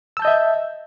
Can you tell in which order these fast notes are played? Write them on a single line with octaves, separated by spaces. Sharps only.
E6 A5 G6 D#5 E5